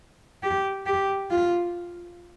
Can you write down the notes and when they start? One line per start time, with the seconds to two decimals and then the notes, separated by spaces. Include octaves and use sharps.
0.43 G4
0.86 G4
1.31 F4